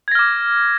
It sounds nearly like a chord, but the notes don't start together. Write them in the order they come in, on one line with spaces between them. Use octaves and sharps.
G#6 A#6 F6 D6